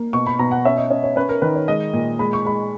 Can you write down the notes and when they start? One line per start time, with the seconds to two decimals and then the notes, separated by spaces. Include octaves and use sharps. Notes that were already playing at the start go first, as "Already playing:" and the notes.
Already playing: A#3
0.13 B2 C#6
0.27 B5
0.39 B2 A#5
0.51 F#5
0.65 C#4 E5
0.77 D#5
0.90 C#4 D#5
1.04 C#5
1.16 C#4 B4
1.29 A#4
1.42 D#3 B4
1.56 C#5
1.68 G#3 D#5
1.93 A#2
2.19 G#3 B5
2.33 C#6
2.45 G#3 B5